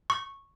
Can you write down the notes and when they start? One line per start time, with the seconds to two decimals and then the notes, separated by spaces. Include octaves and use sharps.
0.10 C#6